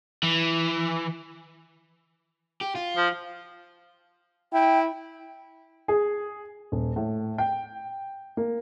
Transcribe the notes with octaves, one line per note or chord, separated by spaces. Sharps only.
E3
G4
F4
F3
E4 G5
G#4
D#1
A2
G5
A#3